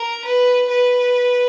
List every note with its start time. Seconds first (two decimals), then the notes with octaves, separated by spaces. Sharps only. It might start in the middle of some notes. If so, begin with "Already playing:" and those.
Already playing: A#4
0.25 B4
0.70 B4